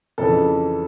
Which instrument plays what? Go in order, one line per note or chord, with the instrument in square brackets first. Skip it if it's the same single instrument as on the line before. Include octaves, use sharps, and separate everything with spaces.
[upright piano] F2 C#3 E3 A4